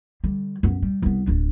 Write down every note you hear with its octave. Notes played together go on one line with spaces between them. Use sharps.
D3 G3
F#2 B3
G3
C2 B3
D1 D4